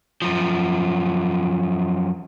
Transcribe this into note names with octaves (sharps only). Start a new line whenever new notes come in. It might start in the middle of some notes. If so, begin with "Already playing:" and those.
F#2 F3